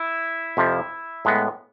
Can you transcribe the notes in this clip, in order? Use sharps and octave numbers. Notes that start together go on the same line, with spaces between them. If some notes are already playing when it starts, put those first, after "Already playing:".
Already playing: E4
F2 C3 F3
A2 G#3 B3